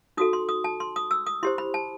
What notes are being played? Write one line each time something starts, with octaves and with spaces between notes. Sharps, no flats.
D#4 F#4 A4 D#6
C6
D#6
A5
C6
D#6
E6
D#6
E4 G4 C5 C6
B5
A5